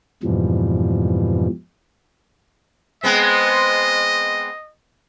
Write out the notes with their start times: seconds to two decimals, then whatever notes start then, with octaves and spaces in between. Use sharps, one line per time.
0.23 F2 G#2 B2 E3 F3 G3
3.03 G#3 B3 C4 D#5